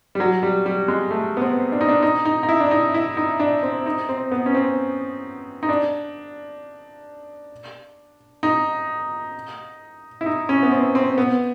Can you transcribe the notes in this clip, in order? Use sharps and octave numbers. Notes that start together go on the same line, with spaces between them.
G3
F#3
G3
G3
G#3
A3
B3
C4
D4
D#4
D4
D#4
D#4
D#4
E4
D4
D#4
E4
D#4
D4
C4
D#4
C4
B3
C#4
C4
D#4
D4
D#4
E4
D#4
C#4
B3
C4
C4
B3